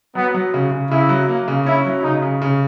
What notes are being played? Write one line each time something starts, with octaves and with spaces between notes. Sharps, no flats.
F#3 B3
F#3
C#3
C#3
C#3 E4
F#3
A#3
C#3
C#4 E4
F#3
C#3 D#4
C#3
C#3